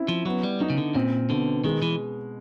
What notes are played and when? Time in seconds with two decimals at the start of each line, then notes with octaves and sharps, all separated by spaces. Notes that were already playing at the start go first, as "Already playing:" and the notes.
Already playing: C4 E4
0.08 F3
0.25 F#3 B3
0.43 G3
0.60 F#3 D#4
0.70 C#3
0.78 D3
0.95 A#2 C4
1.30 B2 D3
1.64 D#3 G#3
1.82 E3